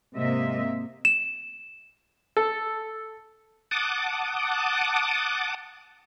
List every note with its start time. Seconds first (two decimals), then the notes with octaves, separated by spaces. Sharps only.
0.15 G#2 C3 A#3 C4 D#5 E5
1.05 E7
2.37 A4
3.71 F#5 A5 D6 D#6